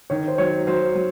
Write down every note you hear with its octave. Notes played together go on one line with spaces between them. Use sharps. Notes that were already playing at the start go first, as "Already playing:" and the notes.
D#3 C#5
C5
F#3 C#5
F#3 C5
F#3